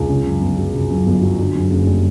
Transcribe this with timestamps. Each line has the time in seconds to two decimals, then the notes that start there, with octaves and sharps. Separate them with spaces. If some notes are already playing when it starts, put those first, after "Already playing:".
Already playing: C#2
0.09 C#3
0.26 F#2
0.42 G1
0.58 F#3
0.74 C#3
0.91 F#2
1.06 G1
1.22 F#3
1.39 D3
1.55 F#2
1.71 F#1
1.87 G3